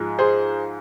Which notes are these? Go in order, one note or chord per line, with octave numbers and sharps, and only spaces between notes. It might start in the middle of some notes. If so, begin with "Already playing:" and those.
Already playing: G#2 F3 G#3
G#4 C5